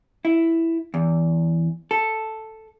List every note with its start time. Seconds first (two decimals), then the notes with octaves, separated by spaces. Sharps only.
0.25 E4
0.94 E2
1.91 A4